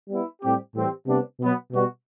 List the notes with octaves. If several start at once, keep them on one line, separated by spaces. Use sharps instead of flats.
G3 B3 E4
A2 G3 C4 G4
A2 E3 G3 C4 G4
C3 G3 B3 D4
B2 F#3 B3
B2 G3 B3 F#4